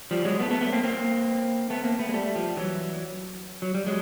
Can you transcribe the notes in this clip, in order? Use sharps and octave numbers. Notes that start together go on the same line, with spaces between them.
F3 G3
F#3 G#3
A3 B3
A3 B3
A3 B3
A#3 C4
A#3 C4
A3 B3
A#3 C4
A3 B3
G#3
G3 A3
F3 G3
E3 F#3
F#3
G3
F#3 G#3